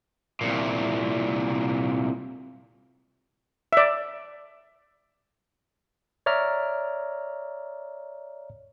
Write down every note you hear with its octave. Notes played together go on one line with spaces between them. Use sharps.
C2 A#2
D5 E5
C#5 D5 E5 A#5 F6